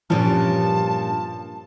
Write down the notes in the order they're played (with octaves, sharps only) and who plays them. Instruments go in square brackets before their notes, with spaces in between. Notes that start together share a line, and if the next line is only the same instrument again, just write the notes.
[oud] G2 A#2 C#4 [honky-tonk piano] F3 [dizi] A5